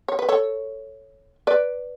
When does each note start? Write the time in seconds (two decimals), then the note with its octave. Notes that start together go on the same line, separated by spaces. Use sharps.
0.08 C#5
0.19 B4
0.29 A4 C#5
1.47 B4 D5